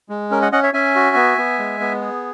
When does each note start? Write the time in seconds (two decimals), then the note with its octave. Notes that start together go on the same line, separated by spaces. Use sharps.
0.09 G#3
0.31 C#4 A#4
0.42 D#5 F#5
0.52 C#4 D#5 F#5
0.63 C#5 E5
0.73 C#4 E5 G#5
0.96 F#4
1.16 B3
1.38 B3
1.59 G#3
1.81 B3
2.01 G#4